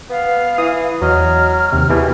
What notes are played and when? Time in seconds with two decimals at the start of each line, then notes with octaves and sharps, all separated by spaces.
0.10 B3 F5
0.58 E3 D#6
1.02 E2 F#3 D#5 F6
1.72 D#2 C3
1.89 B2 E3 G4 G#4